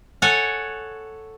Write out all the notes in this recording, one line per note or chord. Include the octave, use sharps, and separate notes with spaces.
A4 C#5 F#5 G#5